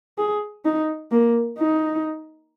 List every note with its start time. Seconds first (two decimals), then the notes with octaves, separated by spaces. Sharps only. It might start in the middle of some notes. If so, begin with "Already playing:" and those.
0.18 G#4
0.65 D#4
1.11 A#3
1.58 D#4